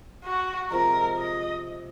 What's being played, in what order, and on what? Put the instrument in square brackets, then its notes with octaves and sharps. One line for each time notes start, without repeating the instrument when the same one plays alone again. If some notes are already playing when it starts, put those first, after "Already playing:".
[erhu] F#4
[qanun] C3 F3 G#3 [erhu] A#4
[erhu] D#5